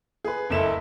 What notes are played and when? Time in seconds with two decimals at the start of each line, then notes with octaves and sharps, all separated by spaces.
0.24 G#4 B4
0.50 F#1 C#2 A3 E4 E7